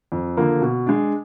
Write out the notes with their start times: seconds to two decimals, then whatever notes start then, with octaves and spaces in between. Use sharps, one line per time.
0.12 F2
0.37 D3 F3 A#3
0.61 B2
0.86 G#3 D4